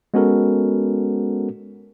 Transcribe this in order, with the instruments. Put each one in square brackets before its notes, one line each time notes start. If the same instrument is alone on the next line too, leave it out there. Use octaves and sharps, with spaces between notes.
[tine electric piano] G#3 B3 C#4 F#4 A4 A#4